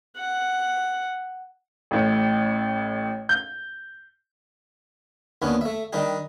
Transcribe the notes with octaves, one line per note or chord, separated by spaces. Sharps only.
F#5
A1 A2
G6
D#2 B3 C#4 D4
A3 E5
D#3 G3 D4 D#4 G4